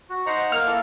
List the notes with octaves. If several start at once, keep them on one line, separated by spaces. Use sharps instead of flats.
F#4
D#4 C5 F#5 A#5
A#3 F6
E4 A4